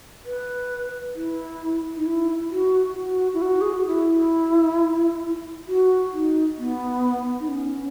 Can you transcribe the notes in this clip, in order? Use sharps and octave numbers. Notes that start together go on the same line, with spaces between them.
B4
E4
D#4
E4
F#4
F#4
E4
F#4
G#4
F#4
E4
F#4
D#4
B3
D#4
C#4